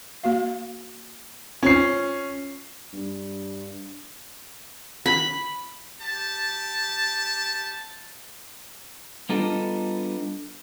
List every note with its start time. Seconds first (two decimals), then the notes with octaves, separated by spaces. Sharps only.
0.24 A#3 F#4 F5
1.63 C#4 F4 C5 C7
2.93 G2
5.06 B5
6.01 G4 A5
9.29 G3 B3 D4 D#4 F4 A4